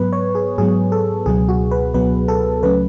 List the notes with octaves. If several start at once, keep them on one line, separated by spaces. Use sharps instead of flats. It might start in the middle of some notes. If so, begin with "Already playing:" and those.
Already playing: G#2 F#3 B3 B4
C#5
G#4
G#2 F#3 B3 G#4
A4
C#2 B2 F#3 B3 G#4
F#4
B4
C#2 B2 F#3 B3 B4
A4
C#2 C#3 F#3 A3 C#4 B4